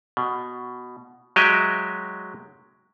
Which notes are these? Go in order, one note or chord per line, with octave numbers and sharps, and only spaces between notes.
B2
F#3 G#3 G4 D#5 E5